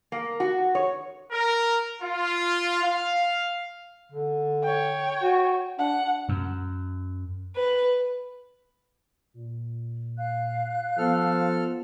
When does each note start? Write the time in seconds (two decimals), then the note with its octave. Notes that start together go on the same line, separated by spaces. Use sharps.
0.12 A#3
0.40 F#4
0.75 C#5
1.32 A#4
2.02 F4
2.82 F5
4.12 D3
4.63 C#5 G5
5.22 F#4
5.79 D4 F#5
6.29 F#2
7.56 B4
9.34 A#2
10.17 F5 F#6
10.98 F3 B3 A4 F6